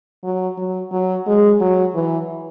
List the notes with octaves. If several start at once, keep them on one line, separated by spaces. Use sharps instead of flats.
F#3
F#3
F#3
G#3
F#3
E3